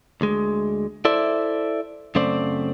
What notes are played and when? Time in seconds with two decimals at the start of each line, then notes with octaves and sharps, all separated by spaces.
0.21 D2 G#3
1.05 E4 A4 C5 D5 E5
2.15 F#2 C#3 A3 C4 C5 D5